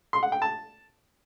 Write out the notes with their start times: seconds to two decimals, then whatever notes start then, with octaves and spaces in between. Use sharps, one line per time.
0.13 C6
0.23 F#5
0.32 G5
0.42 A5